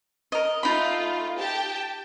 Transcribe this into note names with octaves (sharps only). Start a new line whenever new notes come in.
A#4 D#5
A3 D#4 F4 B5
G4 G5 A5